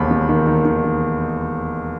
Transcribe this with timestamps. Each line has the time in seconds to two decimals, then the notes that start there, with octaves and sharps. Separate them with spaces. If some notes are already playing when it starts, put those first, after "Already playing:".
Already playing: E1 D#2 B5
0.11 D#2
0.29 D#3
0.47 D#3
0.65 D#3
0.84 D#3